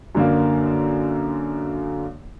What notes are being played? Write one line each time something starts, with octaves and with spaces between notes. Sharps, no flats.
F#2 D3 A#3